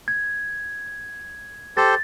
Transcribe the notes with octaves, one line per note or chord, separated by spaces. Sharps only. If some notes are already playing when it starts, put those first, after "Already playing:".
G#6
G4 A4 C5 A6